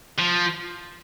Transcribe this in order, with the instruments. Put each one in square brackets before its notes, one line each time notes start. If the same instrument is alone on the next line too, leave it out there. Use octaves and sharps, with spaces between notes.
[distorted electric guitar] F3